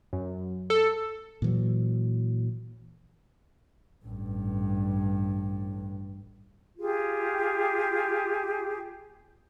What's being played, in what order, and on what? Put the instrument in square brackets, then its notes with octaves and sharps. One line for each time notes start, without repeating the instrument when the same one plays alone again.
[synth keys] F#2
A4
[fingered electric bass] A#2 E3 F#3
[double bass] A1 G2
[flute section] F4 G4 G#4